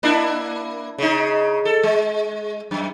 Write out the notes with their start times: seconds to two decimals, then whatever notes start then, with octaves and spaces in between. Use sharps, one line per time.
0.03 A#3 D4 E4
0.98 C#3 D#4
1.65 A4
1.83 G#3
2.71 F#2